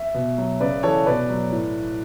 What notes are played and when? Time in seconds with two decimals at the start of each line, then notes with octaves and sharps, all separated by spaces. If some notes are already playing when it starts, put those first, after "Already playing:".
Already playing: E5
0.14 B2
0.38 F#3
0.60 C#3 B4 D5
0.83 E3 A4 C#5
1.06 B2 B4 D5
1.30 F#3
1.52 A2